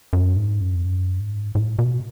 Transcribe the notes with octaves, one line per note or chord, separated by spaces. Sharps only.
F#2
G#2
F#2
F2
F#2
G#2
A2
B2